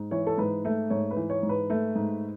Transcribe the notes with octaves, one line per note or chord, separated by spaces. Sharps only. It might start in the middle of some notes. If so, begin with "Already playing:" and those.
Already playing: G#2
E3 C#5
A4
G#2 B4
A3
G#2 C#5
B4
E3
C#5
G#2
B4
A3
G#2